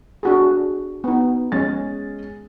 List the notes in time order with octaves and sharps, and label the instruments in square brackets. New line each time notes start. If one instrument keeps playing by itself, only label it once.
[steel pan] D4 F#4 G#4
B3 D#4
[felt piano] G#3 C#4 A6